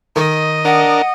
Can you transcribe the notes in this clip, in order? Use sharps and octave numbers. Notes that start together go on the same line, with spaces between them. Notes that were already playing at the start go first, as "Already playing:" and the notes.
D#3 D#5
D4 A#4 F#5